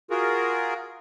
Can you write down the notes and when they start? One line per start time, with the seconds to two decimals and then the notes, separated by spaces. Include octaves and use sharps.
0.10 F4 F#4 G#4 A#4